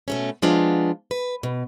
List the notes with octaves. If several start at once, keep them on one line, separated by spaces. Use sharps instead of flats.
B2 A3 C#4
F3 G#3 B3 D4 F4
B4
B2